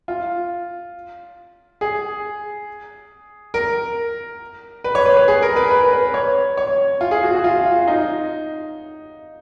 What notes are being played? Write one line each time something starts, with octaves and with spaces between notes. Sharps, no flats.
F4
G#4
A#4
B4
C#5
B4
B4
G#4
A#4
B4
B4
B4
C#5
C#5
F4
G#4
F#4
F#4
F4
F4
D#4